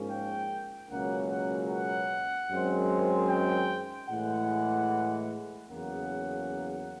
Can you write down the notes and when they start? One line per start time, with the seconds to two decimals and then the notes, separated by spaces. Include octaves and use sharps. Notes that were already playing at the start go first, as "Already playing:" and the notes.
Already playing: G#2 F3 A#3 C#4
0.11 G5
0.90 C#2 B2 F#3 A#3 C#4 F#5
1.30 F#5
1.71 F#5
2.50 F#2 D#3 G#3 C4
3.30 G5
4.09 A2 E3 G#3 F#5
5.69 E2 C#3 F#3 A#3 C#4 F#5